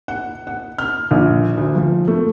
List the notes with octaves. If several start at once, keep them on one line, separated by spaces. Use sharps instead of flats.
F#5
F#5
F6
A#1
D2
F3
A3